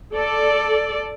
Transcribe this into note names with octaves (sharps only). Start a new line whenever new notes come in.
A4 D5